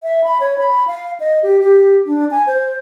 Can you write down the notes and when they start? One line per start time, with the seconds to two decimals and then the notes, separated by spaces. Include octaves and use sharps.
0.03 E5
0.24 B5
0.40 C#5
0.58 B5
0.87 F5
1.20 D#5
1.43 G4
1.60 G4
2.06 D4
2.31 G#5
2.47 C5